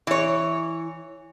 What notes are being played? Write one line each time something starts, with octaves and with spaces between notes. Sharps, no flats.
E3 C#5